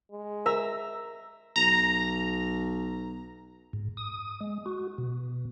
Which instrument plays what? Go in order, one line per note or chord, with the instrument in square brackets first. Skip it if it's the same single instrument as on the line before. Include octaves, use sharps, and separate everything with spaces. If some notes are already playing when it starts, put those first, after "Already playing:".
[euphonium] G#3
[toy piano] A#4 [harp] E5 A#5 [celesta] E6
[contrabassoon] B1 [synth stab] A#5
[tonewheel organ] G#2
D#6
G#3
F#4
B2